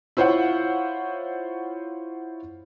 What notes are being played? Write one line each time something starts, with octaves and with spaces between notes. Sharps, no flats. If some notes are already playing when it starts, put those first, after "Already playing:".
E4 F4 C5 C#5 F5 F#5